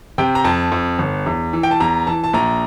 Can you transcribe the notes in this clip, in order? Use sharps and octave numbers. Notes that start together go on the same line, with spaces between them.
C3 G5
A#5
F2 A5
F2
G1
E2
E3
G5
A5
E2 A#5
E3 A5
A5
A#1 A#5